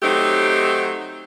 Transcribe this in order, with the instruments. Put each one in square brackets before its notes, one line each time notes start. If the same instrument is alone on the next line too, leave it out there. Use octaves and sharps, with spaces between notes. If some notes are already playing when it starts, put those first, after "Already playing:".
[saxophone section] F#3 A3 C4 D#4 G4